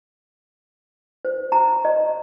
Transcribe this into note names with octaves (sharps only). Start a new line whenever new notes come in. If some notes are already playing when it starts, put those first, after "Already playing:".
C5
A#5
D#5